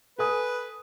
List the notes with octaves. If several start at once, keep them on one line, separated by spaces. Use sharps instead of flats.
A4 B4 G#5 D#6